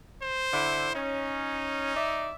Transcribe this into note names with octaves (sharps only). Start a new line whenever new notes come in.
C5
D3 E4
C#4 D#4
D5 E5